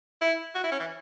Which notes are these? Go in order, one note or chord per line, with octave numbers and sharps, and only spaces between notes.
E4
F#4
E4
C#4
E3